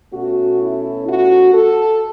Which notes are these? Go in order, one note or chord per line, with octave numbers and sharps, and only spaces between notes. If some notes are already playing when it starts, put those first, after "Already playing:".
B2 A3 C#4 F#4
E4
F#4
A4